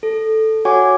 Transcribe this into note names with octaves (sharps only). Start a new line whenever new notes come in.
A4
F#4 C#5 F#5 G#5 C#6 D6